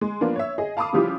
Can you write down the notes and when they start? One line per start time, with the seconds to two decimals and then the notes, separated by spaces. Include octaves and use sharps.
0.01 G#3
0.21 F3 A#3 B3 D4
0.36 C#5 E5
0.58 G#4 D#5
0.77 F5 A5 B5 D6 D#6
0.93 C#3 F3 G3 E4 F4 G4